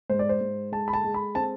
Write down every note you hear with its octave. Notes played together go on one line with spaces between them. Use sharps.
G#2 C5
D5
C5
G#2
G#3 A5
B5
A5
G#3
B5
C4 A5